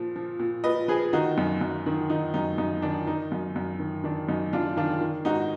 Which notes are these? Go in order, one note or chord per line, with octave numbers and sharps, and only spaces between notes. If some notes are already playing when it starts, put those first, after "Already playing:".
Already playing: A#2 F3
F3
A#2
A#2 B4 D#5
F3 G#4 B4
D#3 D#4 F#4
F#2
F#2
D#3
D#3 D#4
F#2 D#4
F#2 D#4
D#3 D4
D#3 D#4
F#2
F#2
D#3
D#3 D4
F#2 D#4
F#2 D4 F4
D#3 D4 F4
D#3
G#2 D#4 F#4